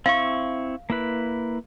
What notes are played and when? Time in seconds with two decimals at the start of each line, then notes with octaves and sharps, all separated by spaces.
0.06 C4 E4 F5 C#6
0.90 A#3 E4 B4